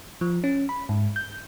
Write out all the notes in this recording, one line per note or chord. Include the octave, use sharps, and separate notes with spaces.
F3
C#4
B5
G#2
G6